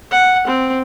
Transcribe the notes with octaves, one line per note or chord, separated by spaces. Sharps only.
F#5
C4